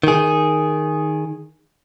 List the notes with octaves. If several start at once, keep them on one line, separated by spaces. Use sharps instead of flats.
D#3 G#4